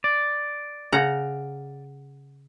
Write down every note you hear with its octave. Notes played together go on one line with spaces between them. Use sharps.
D5
C#3 F#5 A#5